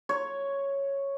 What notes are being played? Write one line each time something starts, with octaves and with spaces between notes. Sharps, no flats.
C#5